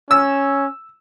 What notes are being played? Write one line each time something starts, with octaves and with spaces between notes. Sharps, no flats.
C#4 E6